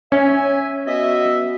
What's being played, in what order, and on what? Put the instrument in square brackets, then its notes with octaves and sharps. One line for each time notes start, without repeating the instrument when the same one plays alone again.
[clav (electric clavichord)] C#4 [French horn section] C#5 [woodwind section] E5 G#5
[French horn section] B3 F#4 [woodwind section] D#5 E5